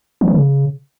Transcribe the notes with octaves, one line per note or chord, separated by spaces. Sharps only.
E3
D#3
C#3